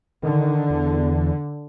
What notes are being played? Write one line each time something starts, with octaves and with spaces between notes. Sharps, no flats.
D3 D#3
E2